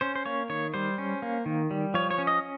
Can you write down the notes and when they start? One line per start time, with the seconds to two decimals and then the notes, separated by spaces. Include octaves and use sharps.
0.01 C#4 C5
0.15 C5
0.26 A#3 C#5
0.49 D#3 C#5
0.74 G3 C5
0.98 C#4
1.22 A#3
1.46 D#3
1.71 G3
1.94 F3 C#5
2.11 C#5
2.18 C#4
2.27 D#5